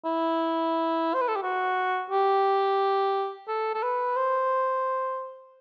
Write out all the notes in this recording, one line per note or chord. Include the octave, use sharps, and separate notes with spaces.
E4
C5
B4
A4
G4
F#4
G4
A4
A4
B4
C5